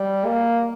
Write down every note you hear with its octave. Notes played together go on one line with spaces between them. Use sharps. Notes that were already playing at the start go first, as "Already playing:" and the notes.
Already playing: G3
A#3